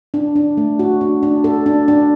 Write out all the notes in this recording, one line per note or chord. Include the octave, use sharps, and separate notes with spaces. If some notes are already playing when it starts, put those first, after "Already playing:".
D4
D4
A3
F#4
D4
D4
A4
D4
D4